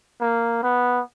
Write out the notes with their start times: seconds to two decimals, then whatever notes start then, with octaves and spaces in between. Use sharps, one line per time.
0.21 A#3
0.63 B3